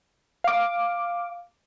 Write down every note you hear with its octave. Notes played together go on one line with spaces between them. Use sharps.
F5 D6